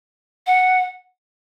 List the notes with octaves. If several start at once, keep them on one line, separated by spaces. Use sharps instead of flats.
F#5